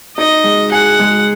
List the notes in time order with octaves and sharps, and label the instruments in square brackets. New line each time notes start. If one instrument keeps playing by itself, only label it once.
[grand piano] D#4 [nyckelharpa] D#5
[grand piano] G#3
[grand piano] G#4 [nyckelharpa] F#5
[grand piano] G#3